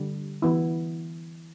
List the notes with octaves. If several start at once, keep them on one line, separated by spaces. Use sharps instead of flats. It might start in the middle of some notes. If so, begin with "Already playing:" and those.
Already playing: D3 G3
E3 B3 E4